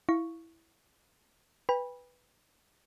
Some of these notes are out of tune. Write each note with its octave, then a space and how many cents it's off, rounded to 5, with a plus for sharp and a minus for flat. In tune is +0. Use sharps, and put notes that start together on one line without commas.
E4 +0 F5 +0 C#6 +0
B4 +0 G5 +40 B5 -15